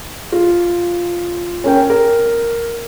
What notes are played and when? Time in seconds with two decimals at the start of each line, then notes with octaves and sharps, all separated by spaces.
0.32 F4
1.64 C#4 A#4 G5
1.90 A#4